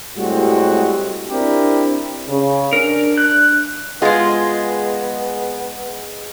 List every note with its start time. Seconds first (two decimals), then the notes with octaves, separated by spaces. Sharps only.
0.17 A2 G3 G#3 C4 F#4
1.31 C4 D4 E4 G4 A#4
2.28 C#3
2.73 D4 A#4
3.18 F#6
4.02 G#3 B3 F4 G#4 D#5